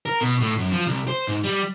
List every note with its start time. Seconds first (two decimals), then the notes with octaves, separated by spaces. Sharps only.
0.06 A#4
0.21 B2
0.40 A2
0.57 F#2
0.71 F3
0.86 C2
1.08 C5
1.28 G#2
1.43 G3